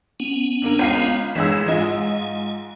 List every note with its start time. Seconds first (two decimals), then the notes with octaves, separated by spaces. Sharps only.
0.20 B3 C#4
0.62 D3 A#3 A#4
0.79 C#2 F5 C7
1.35 A1 E3 G#3 E6
1.68 G#2 F4 D#5 G#5